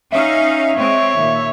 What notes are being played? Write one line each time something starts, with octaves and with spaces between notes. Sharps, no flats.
C#4 D#4 E5 F5
G#3 C4 C#5
D#2 A#2